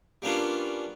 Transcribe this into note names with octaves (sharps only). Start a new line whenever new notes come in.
G3 A#3 B3 C#4 D4 F4